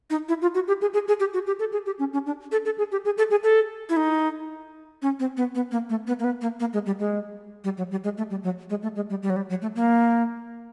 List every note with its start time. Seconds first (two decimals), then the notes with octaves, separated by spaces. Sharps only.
0.10 D#4
0.29 E4
0.42 F4
0.55 F#4
0.68 G4
0.81 G#4
0.94 G#4
1.08 G#4
1.20 G4
1.34 F#4
1.47 G4
1.60 A4
1.72 G#4
1.86 G4
1.99 C#4
2.13 C#4
2.26 D4
2.52 A4
2.65 A4
2.78 G#4
2.92 G4
3.05 G#4
3.18 A4
3.31 G#4
3.44 A4
3.89 E4
3.97 D#4
5.02 C#4
5.20 C4
5.37 B3
5.55 B3
5.72 A#3
5.90 A3
6.07 B3
6.19 A#3
6.24 B3
6.41 A#3
6.60 A#3
6.73 G#3
6.86 G3
6.99 G#3
7.64 G3
7.78 F#3
7.91 G3
8.04 G#3
8.18 A3
8.30 G3
8.43 F#3
8.70 G#3
8.83 A3
8.96 G#3
9.10 G3
9.23 G3
9.30 F#3
9.36 G3
9.49 F#3
9.62 A3
9.76 A#3